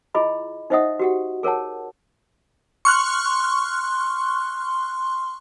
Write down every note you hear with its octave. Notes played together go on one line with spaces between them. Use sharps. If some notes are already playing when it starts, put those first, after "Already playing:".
E4 F4 G#4 D#5 B5
D#4 C5 D#5 E5 F#5 D#6
F#4 G4 F#5
G#4 A#4 C#5 F#5 A5
C6 C#6 F6 F#6